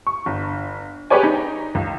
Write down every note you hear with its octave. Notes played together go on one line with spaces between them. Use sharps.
C#6
G1
G4 G#4 B4 C#5 D5 G#5
D#4
C#2